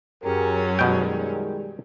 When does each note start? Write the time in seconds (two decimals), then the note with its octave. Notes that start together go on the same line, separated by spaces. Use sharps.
0.23 F#2 F#3 C#4 G4 G#4 A#4
0.79 B2 D#3 G3 G#3 G5